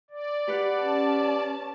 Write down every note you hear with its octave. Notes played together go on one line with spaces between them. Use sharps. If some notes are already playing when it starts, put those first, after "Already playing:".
D5
G4 B4 F#5
C#4 A5